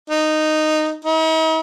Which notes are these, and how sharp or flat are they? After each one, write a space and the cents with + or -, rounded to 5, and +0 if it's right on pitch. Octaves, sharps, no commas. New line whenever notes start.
D#4 -10
D#4 +45